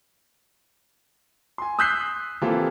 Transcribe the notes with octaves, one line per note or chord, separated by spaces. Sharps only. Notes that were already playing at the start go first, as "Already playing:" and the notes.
G#5 C6
D#6 E6 F#6 G6 B6 C7
E3 A#3 C4 F4 G4 A4